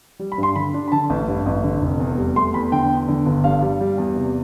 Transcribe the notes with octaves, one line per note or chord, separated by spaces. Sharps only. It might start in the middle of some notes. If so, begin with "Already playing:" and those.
G3
B5
G2
C6
D3 B5
D4
B5
D3 A5
A1
G2
A1
D3
F1
E2
G3
A3 C6
E2 B5
D3 G5
E2
D3
G1
G2 F5
G3
G3
E2
C3